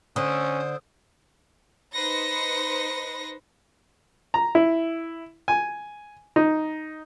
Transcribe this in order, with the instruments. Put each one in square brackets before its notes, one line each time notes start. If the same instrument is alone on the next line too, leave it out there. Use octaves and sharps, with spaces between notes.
[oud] D3 [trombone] C#4 [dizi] C5 [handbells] D#6
[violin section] D#4 B4 C5 C6 A#6 C#7
[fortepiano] A#5
E4
G#5
D#4